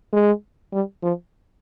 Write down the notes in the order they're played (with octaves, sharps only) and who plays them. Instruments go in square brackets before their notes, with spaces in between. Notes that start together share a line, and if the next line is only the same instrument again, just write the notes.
[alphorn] G#3
G3
F3